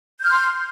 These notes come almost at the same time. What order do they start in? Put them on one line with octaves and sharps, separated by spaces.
G6 F6 C6